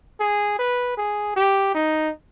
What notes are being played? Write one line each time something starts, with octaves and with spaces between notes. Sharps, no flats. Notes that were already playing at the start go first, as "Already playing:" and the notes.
G#4
B4
G#4
G4
D#4